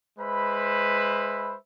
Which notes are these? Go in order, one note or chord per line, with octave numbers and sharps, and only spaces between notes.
G#3 B4 C5 E5 B5